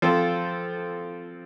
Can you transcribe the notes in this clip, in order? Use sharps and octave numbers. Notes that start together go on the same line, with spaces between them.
F3 C4 F4 A4